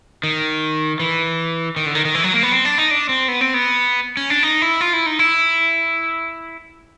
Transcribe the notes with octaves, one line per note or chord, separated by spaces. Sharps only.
D#3
E3
D#3
D3
D#3
D#3
E3
F#3
A#3
B3
C4
D4
D#4
D4
C4
B3
C4
B3
C#4
D4
D#4
E4
F4
E4
D#4
E4